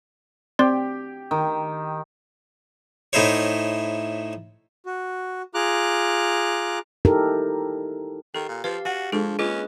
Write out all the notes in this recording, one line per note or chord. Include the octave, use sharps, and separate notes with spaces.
C4 G4 D5 C6
D#3
A2 A3 D#4 E4 C5 C#5
F#4
F4 G#4 A#5 D6 F#6
D#4 E4 G4 A4 A#4
D#3 G4 A4
A#2
F3 G4 B4 F5
F#4 F#5 G#5
F3 G#3 D4 G#4 A4 C#6
A#3 C#4 F4 G#4 B4 D#5